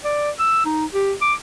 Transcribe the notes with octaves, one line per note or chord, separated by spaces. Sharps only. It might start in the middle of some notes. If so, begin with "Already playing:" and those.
D5
E6
D#4
G4
D6